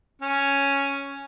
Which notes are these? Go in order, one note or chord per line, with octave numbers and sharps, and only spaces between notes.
C#4